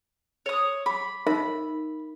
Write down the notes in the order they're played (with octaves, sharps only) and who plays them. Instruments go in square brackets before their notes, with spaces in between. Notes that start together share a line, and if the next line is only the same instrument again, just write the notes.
[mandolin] C#5 D#6
[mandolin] B5 [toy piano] D6
[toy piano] D#4 A#4 E5 [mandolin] B5